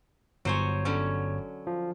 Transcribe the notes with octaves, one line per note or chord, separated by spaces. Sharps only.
G1 F#3 C5 C#5 G#5
D3 F#3 C#4
F3